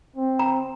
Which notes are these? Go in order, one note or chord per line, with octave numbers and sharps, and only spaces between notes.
C4
A#5